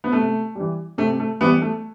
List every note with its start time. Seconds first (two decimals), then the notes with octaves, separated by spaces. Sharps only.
0.04 B3
0.12 C3 A3
0.55 E3 G3
0.98 C3 A3
1.20 A3
1.41 E3 G3 B3
1.62 A3